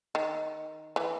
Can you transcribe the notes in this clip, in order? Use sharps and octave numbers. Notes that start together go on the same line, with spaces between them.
D#3
E3